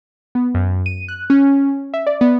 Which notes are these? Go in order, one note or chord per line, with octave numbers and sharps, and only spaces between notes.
B3
F#2
D#7
F#6
C#4
E5
D5
B3